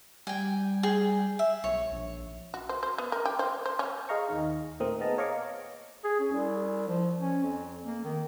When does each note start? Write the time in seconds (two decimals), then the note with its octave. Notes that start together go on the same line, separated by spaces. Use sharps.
0.27 G3 G5 G#5
0.83 G#4 G5
1.39 E5
1.64 B1 C#5
1.92 A#1
2.54 F#4
2.69 C5
2.83 C5
2.98 B3
3.12 A#4
3.25 G4
3.39 C5
3.66 C5
3.79 C#4
4.09 G#4 D#5 F5 A#5 C#6
4.28 D#2 D#3 D#4
4.80 A#2 A3 C4 A#4 D#6
5.00 B3 G#4 D#5 A5 A#5
5.18 C#5 D#5 F5 A#5 C#6 D6
6.04 G#4
6.19 C#4
6.32 C2
6.88 F3
7.18 C#4
7.43 F2
7.85 A#3
8.04 D#3